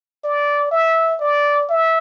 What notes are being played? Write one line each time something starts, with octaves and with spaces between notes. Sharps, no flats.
D5
E5
D5
E5